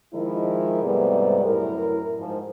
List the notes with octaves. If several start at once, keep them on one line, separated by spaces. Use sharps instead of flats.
D#3 F3 G#3 E4
G#2 C3 G3 A3 B3 D5
F#2 A2 E4 A#4
G#2 F3